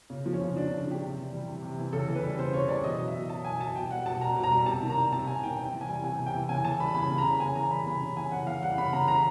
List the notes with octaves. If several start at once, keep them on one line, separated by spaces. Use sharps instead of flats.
C#3
F3
C#4
C#3
F3 D4
D4
C#3
D4
F3 G4
C3
E3
G3
C3
C3
E3
C#3 A4
E3
B4
G3
C#3 C5
C#3 C#5
E3 D5
B2 D#5
F#3
E5
B2
F#3 A5
B2 G#5
F#3 A5
B2 G5
G3 F#5
B2 A5
G3 A#5
B2
A#5
G3
C3 A5
D#3
A#5
G3
C3 A5
C3 G#5
D#3 G5
C3 G5
E3
G#5
G3
C3 G#5
C3
G5
E3
C#3 G#5
E3 A5
G3 B5
C#3 B5
C#3
A#5
E3
C#3 G#5
E3 A#5
G3 B5
C#3 B5
C#3
E3 G#5
C#3 F#5
E3 F5
G3 F#5
C#3 B5
C#3 A#5
E3 A#5